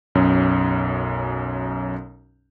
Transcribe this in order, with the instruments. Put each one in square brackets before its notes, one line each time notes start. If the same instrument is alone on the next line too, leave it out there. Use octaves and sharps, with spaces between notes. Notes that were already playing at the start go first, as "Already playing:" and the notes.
[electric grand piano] B1 F#2 C#4